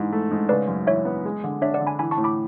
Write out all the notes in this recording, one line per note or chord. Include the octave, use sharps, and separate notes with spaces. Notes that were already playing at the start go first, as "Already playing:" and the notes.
Already playing: G#2 E3
A3
G#2
C#3 B4 D5
F#2
E3 C#5 E5
B3
G#3
D3
D4 C#5 E5
D5 F#5
D3
G#5 B5
E3 G#5 B5
A5 C#6
A2
B5 D6